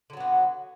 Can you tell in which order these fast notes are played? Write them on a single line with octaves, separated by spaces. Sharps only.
D3 F#3 B3 F#4